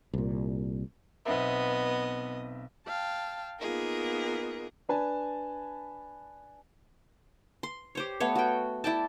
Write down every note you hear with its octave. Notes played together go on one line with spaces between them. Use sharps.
C2 A#2
B1 B3 C4 D#5 E5
F5 G5 A5
A#3 B3 D#4 F4 G#4 A#4
D4 B4 G#5 A5
C6
G4 C5 C#5
A3 B3 C#5
F#4 G5
E4 D5 G5 A5